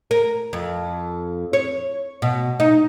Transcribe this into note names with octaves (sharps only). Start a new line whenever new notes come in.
A#4
F2
C#5
B2
D#4